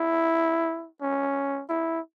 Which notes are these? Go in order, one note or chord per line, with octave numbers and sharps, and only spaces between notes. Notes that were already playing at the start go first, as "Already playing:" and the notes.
Already playing: E4
C#4
E4